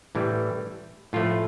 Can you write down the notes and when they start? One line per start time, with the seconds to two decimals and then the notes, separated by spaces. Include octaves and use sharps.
0.15 A2 E3 G3
1.13 A2 F3 A3 F4